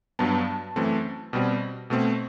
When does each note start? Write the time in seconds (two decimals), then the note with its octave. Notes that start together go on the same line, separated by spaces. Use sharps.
0.19 G2 F#3 B3 A5
0.76 F#2 E3 A3 C4
1.33 B2 G3 C4
1.90 B2 A3 C4